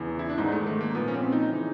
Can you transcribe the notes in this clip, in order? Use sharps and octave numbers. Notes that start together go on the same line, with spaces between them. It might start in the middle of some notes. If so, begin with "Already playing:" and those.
Already playing: E2 C#3 E3
E4
D4
G#2 D#3 D#4
A3
A3
A#3
A#2 F3 B3
C#4
C4
D#4
C#3 E3